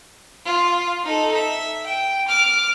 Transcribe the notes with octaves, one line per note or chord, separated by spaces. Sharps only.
F4
D#4 A4
E5
G5
D6 F6